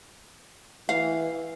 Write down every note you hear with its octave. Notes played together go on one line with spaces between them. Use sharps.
E3 F5